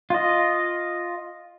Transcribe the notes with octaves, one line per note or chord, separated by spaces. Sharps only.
F4 D#5